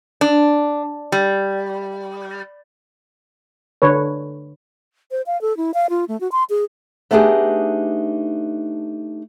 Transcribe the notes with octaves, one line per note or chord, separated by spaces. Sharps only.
D4
G3
D3 B4 C#5
C5
F5
A4
E4
F5
F4
A3
F#4
C6
G#4
A3 B3 D4 D#4 G4 G#4